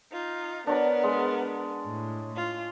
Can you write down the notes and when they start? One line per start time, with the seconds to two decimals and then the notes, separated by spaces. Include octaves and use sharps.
0.12 D#4 F4
0.67 B3 D4 A#4 C#5 A#5
1.03 G#3
1.87 A2
2.36 F4